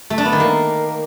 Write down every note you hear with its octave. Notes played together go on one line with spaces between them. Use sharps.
A3
D4
B3
D#3
A#3